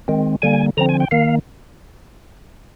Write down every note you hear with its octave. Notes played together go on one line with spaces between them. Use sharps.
D#3 G#3 C4
D3 G3 A#3 G#5
D3 F3 C4 A#5
G#5
G5
D#3 A#3 F5